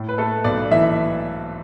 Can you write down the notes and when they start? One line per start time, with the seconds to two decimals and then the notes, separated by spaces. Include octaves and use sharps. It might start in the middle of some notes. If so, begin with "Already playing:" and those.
Already playing: A2
0.09 B4
0.18 A3 A4
0.44 B1 D5
0.71 E3 E5